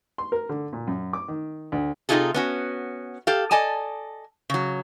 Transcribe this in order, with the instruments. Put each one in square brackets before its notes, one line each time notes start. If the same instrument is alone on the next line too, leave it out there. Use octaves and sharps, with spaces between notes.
[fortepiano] C6
A#4
D3
A#2
F#2
D6
D#3
D2
[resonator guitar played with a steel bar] C3 F3 D#4 F4 G#4 A4
B3 C#4 F#4
G4 A4 F5
A4 D5 D#5 G#5 A5
C#3 F#3